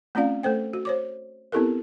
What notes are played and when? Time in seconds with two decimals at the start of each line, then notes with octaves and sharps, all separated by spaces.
0.15 A3 C4 C#4 F4 D5 F5
0.43 A3 A4 C5 G5
0.73 F#4
0.85 C5 C#5 D6
1.52 B3 C4 E4 G4 A4 A#4